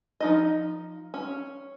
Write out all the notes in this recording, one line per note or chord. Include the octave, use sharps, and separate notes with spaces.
F3 D#4 D#5
C#4